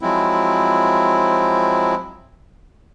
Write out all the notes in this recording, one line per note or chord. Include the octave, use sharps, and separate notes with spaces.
F3 F#3 G#3 C4 E4